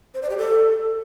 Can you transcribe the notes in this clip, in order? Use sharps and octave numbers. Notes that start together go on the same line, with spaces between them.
C5
D5
G4
A4